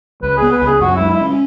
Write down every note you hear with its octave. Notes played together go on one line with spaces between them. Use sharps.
C#2 B4
B3 G#4
B4
C#2 G#4
F#2 F#4
G#3 E4
E4
C#4